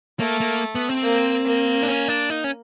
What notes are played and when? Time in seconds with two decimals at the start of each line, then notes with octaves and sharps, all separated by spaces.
0.19 A3 A#3
0.40 A#3
0.75 B3
0.89 C4
1.03 A#3
1.45 A#3
1.83 D4
1.87 C#4
2.08 D4
2.30 D#4
2.44 C#4